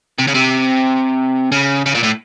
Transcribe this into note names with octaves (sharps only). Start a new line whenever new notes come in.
C3
C#3
C3
C#3
C#3
A#2
A2